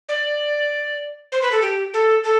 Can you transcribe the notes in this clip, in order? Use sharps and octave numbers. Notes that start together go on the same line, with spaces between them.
D5
C5
B4
A4
G4
A4
A4